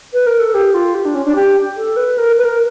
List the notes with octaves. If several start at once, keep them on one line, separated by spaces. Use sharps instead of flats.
B4
A#4
A4
G4
F4
G4
D4
C#4
D4
G4
A4
B4
A#4
B4
A#4